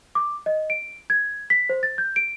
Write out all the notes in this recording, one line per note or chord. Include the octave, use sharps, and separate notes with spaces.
D6
D#5
D7
G#6
B6
C5
A6
G6
D7